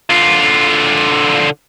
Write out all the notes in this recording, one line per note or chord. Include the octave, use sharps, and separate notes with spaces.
D3 F4